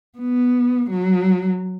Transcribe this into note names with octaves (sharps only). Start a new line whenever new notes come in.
B3
F#3